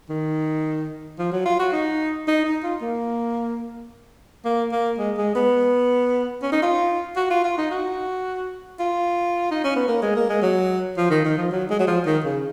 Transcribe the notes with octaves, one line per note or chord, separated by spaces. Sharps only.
D#3
F3
F#3
F4
F#4
D#4
D#4
D#4
F4
A#3
A#3
A#3
G#3
G#3
B3
C#4
D#4
F4
F#4
F4
F4
D#4
F#4
F4
D#4
C#4
B3
A#3
G#3
A#3
G#3
F#3
F3
D#3
D#3
F3
F#3
G#3
F#3
F3
D#3
C#3